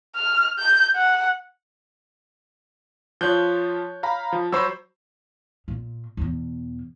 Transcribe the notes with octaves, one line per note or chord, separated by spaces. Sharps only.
F6
G6
F#5
F3 F4 C#5 F#6 G6
F5 A#5 B5
F3
F#3 C5 B5 C#6 E6
A#2
E2 B2